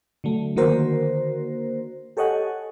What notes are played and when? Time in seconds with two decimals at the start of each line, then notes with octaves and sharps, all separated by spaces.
0.24 D3 F#3 A3
0.56 D3 D#3 A#3 F#4 A#4 C5
2.17 G4 A4 C#5 D#5 F#5 G#5